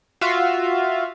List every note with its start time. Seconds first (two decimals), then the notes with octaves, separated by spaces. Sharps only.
0.21 F4 F#4 E5 F5